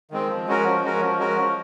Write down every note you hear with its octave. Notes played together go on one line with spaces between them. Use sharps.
D#3 G#3 C4
F3
G#3 C#4 F#4 A#4
F3
G#3 C#4 F#4 A#4
F3
G#3 C#4 F#4 A#4
F3